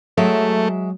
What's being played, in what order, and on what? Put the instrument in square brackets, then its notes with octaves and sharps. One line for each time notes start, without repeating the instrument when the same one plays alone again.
[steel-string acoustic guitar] F#3 G#3 E5 [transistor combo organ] A3